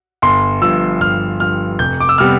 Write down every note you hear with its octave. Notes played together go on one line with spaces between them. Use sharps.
G1 C6
G2 F3 E6
G1 F6
G2 F3 F6
F1 G6
D6
E6
C3 G3 B3 F6